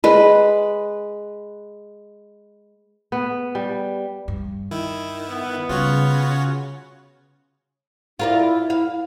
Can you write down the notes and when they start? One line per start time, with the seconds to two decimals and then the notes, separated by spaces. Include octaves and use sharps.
0.04 G#3 B4
3.12 B3
3.55 G3
4.28 G2
4.71 D#3 E4
5.29 B3
5.69 C#3 G3 F4 F#4 C#5
8.19 E4 F4 A#4 D5
8.70 F5